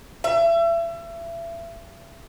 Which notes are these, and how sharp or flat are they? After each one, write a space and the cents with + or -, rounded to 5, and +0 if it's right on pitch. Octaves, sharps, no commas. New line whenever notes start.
E5 +35